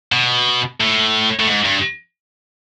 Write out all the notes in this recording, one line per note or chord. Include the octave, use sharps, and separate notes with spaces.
B2
A2
A2
G#2
G2